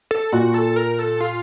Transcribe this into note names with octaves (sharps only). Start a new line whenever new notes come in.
A4
A#2 F#4
A4
A#4
A4
F4